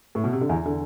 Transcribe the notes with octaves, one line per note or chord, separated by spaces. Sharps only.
A2
B2
C3
D3
E2 E3
D3